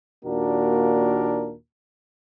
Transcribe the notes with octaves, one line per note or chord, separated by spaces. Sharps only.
D#2 A#2 A#3 D4 F#4 A#4